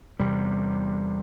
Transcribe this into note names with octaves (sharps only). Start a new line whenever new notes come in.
E2 C3 G3